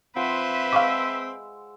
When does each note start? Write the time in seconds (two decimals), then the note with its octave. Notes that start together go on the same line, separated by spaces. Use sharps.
0.16 F3 C4 B4 E5 F#5 C6
0.73 G#3 F5 C#6 D6 E6